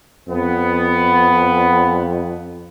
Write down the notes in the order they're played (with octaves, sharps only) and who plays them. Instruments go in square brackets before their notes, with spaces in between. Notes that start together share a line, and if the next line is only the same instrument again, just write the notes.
[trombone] F2 [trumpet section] B3